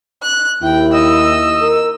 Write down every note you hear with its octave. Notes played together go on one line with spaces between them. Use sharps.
F#6
D#2 E4 G5
D#5 E6
A#4